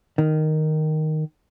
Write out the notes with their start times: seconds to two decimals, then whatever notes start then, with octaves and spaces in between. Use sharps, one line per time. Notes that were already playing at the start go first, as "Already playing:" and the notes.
0.18 D#3